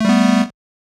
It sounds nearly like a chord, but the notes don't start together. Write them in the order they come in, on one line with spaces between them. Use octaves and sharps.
A3 G3 B3